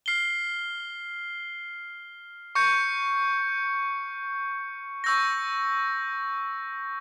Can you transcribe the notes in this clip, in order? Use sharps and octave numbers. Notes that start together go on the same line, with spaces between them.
F6 C7 G7
C#6 G6 C#7
C#6 E6 G6 A#6